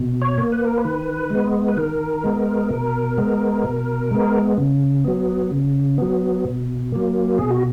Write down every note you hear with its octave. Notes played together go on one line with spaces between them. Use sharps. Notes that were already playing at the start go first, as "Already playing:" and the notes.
Already playing: B2
C#5
A#3
B4
A#4
B4
D#3
G#3 B3
B4
D#3 A#4
G#3 B3
B2
G#3 B3
B2
G#3 B3
C#3
F#3 B3
C#3
F#3 B3
B2
F#3 A#3
B2 G#4
F#4